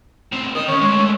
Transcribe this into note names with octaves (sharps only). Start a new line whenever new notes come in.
A2 C4
A#4 D#5 D#6
D#3 C#4 C#5
G#3 A3